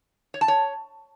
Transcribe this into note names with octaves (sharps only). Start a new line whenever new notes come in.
C#5
A5
C#5